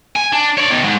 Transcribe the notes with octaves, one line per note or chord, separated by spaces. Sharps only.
G#5
D4
C#5 D5
B2 D#3
G#2